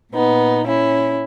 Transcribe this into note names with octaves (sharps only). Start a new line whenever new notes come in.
A#2 B3 D#4
C#4 E4